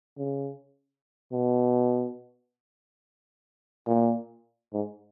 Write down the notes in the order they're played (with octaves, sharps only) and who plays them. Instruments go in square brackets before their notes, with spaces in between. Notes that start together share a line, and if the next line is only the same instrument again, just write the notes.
[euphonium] C#3
B2
A#2
G#2